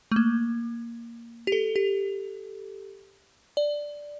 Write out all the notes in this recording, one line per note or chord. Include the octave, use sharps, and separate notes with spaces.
A3
A#3
G4
A4
G4
D5